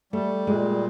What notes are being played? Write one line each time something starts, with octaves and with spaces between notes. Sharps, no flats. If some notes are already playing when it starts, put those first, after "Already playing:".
G3 A3
A#2 G#3